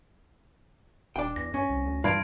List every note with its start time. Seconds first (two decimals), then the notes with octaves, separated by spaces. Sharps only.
1.16 D#1 D4 G5
1.36 E2 A#6
1.54 G2 C#4
1.69 C2
1.86 D2
2.04 G2 E3 F4 F5 B5 G#6 D7